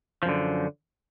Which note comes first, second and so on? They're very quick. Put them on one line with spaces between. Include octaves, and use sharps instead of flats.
F3 F#2 D3